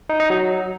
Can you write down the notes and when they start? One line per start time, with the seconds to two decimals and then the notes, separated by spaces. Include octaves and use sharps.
0.09 D#4
0.20 D#4
0.30 F#3